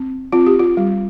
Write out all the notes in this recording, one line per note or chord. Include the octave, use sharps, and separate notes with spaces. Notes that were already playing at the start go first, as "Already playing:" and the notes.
Already playing: C4
C4 F4
G4
F4
G3